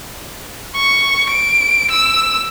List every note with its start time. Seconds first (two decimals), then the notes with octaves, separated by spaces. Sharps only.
0.76 C#6
1.30 D7
1.91 E6